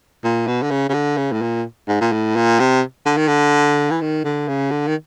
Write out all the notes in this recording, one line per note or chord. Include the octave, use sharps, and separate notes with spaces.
A#2
B2
D3
C#3
C#3
D3
C#3
A2
A#2
G#2
A#2
A2
A#2
C3
D3
D#3
D3
E3
D#3
D3
C#3
D3
D#3